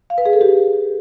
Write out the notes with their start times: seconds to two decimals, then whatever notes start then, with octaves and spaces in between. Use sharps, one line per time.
0.10 F5
0.18 B4
0.26 G#4
0.33 A4
0.41 G4